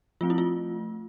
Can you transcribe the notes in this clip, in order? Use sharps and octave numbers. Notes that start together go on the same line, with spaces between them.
F3 A3 C4 F4
E4
F4